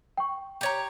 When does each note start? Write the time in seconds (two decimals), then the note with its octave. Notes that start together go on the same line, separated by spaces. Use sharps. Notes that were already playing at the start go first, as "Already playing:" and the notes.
0.17 G5 C#6
0.61 G4 C#5 A#5